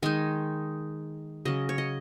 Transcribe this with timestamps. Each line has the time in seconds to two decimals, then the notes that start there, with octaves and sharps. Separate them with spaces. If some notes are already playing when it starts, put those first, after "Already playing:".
0.02 D#3 G#3 D#4 G#5
1.45 C#3 F#3 C#4 D#5
1.69 C#5
1.78 D#5